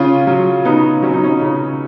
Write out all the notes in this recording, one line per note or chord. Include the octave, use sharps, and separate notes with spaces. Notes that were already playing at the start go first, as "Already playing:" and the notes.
Already playing: C#3 C#4 F4
F#3
C#3 B3 D#4
F#3 C#4
D#4
C#4
C#3